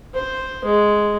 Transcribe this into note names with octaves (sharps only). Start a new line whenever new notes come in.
C5
G#3